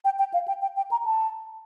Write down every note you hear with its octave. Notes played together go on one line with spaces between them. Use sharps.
G5
G5
F5
G5
G5
G5
A#5
A5